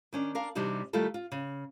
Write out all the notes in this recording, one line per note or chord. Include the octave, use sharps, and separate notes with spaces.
D#3 C#4 D4
D4 A#4 F5
C3 E3 G3 D4 D#4 F#4
D#3 G3 A3 E4 F4 A4
F4
C#3